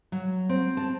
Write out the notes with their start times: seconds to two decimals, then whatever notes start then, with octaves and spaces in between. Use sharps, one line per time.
0.12 F#3
0.49 C4
0.77 A5